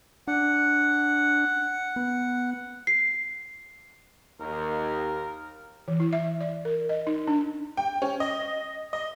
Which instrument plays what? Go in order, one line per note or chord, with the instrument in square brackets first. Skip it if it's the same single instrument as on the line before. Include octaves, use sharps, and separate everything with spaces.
[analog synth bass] D4 [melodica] F#5
[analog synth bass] B3
[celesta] C7
[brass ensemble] D#2 [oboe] A#4
[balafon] E3
E4
E5
D5
A#4
D#5
D#4
D4
[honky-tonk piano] G5
C#4
D#5
D#5